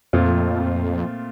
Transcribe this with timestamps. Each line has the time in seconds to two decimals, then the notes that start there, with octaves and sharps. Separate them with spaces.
0.13 F2 A#2 A3 C4 F4